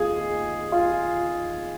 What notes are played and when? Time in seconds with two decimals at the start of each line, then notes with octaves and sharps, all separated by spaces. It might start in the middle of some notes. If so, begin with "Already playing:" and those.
Already playing: D#2 D#3 F4 G#4
0.72 F4